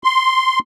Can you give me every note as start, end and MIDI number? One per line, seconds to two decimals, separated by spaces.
0.04 0.59 84